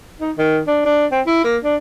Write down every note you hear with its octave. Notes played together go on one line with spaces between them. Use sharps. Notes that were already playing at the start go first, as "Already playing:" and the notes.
D#4
D#3
D4
D4
C4
E4
A#3
D4